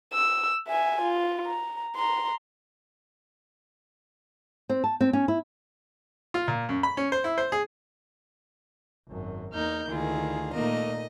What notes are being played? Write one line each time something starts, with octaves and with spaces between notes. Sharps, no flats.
E6
E5 G#5
F4
A#5
A#5 C6
C4
A5
C4
C#4
E4
F4
A#2
F#2
B5
C#4
C5
E4
C5
G#4
G#1 F#2
E2 A#3 D#4 F6 G6
D2 D#3 E4 F4 G#4
A#2 A3 A#3 D#4 D#5